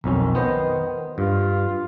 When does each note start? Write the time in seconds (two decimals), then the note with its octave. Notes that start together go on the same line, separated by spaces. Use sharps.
0.04 B1 F2 D#3 C#4
0.35 B3 C5 D#5
1.18 G2 F4